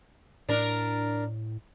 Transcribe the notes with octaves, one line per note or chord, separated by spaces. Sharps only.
A2 D4 A#4